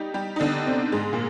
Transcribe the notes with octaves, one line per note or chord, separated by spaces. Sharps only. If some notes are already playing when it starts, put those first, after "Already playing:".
Already playing: G3 D#4 G4
G3 G4
D#4
D3 D4
C3 C4
G#2 G#3
A#2 A#3